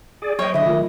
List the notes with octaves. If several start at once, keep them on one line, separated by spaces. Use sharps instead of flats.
G#4 D5
F#3 C5 C#5 D#5 G5
D3 E4 D#5
D#3 F#3 A3 F4